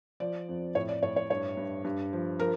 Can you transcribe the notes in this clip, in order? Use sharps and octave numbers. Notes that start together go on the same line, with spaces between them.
F3 D5
F2
A2 C#5
D5
A2 C#5
C#5
G2 C#5
G2
G2
F3
F3 A#4